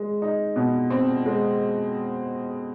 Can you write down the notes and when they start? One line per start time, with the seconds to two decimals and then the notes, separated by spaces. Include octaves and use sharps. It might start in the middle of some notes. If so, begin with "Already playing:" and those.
Already playing: G#3
0.22 D#4
0.56 B2
0.90 C4
1.26 G#3